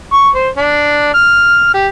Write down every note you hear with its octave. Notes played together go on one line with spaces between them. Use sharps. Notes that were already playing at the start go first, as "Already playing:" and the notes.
C#6
C5
D4
F6
G4